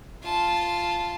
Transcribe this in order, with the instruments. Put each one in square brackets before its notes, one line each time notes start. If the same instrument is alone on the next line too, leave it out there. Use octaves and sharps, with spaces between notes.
[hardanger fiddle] F4 A5